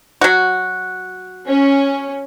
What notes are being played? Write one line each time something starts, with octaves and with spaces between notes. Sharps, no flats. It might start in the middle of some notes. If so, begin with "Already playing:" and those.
F#3 F#4
C#4